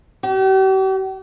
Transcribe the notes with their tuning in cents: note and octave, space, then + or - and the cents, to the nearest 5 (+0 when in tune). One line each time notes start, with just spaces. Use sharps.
G4 -45